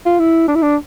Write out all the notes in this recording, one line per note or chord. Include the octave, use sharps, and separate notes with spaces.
F4
E4
D4
E4
D4